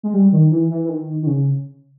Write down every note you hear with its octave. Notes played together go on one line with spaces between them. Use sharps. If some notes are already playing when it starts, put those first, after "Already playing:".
G#3
G3
D#3
E3
E3
E3
D#3
D#3
C#3